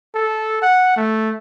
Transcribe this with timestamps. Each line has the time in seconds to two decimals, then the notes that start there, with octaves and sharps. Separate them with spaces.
0.15 A4
0.62 F#5
0.97 A3